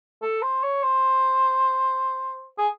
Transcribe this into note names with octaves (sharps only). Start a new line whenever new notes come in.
A4
C5
C#5
C5
G#4